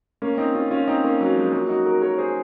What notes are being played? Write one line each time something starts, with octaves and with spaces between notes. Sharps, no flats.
A#3 C#4
C4 D#4
C#4 F4
C#4 F4
C4 D#4
A#3 C#4
F#3
F3 G#3
F#3 A#3
D#4 F#4
F#4 A#4
A#4 C#5
G#4 C5